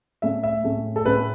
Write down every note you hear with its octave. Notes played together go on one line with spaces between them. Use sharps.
A2 A3 C#4 E5
E5
A2 A3 C#4
A4
A2 A3 C#4 B4